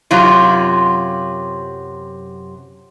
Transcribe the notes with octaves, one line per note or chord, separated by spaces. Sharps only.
F#2 C3 F#3 F4